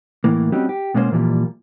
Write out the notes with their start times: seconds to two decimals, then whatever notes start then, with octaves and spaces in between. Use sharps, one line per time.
0.24 A2 E3 A#3
0.52 G3 C4 C#4 D#4 F#4 G4
0.69 G4
0.94 B2 G#3 A#3 C#4 F#4 C5
1.12 A#2 E3 F3 G3 G#3 A#3